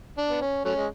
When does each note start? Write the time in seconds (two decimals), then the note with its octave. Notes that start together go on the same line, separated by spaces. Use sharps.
0.17 D4
0.29 B3
0.41 C#4
0.65 F#3 A3 C#4
0.76 G#3